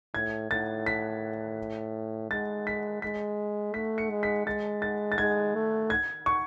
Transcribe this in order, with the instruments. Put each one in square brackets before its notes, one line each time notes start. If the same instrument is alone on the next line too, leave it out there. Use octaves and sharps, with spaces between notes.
[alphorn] A2 [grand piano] G#6
[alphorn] A2 [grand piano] A6
[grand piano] B6
[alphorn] G#3 [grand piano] A6
[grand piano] B6
[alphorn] G#3 [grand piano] B6
[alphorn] A3 [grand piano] B6
[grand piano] C#7
[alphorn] G#3
[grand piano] B6
[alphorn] G#3 [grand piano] A6
[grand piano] A6
A6
[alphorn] G#3 [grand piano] G#6
[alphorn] A3
[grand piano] G#6
C#6